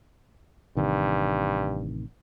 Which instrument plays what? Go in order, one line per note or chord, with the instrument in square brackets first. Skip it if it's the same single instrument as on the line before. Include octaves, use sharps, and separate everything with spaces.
[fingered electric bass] A1 C3 D#3 [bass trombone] G2